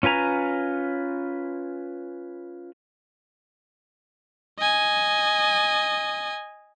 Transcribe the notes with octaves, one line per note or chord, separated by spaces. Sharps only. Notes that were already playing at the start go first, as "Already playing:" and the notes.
C#4 F4 B4 G#5 A#5
D#5 G#5